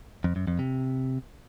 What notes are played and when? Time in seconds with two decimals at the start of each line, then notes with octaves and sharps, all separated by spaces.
0.24 F2
0.36 F#2
0.47 F2
0.59 C3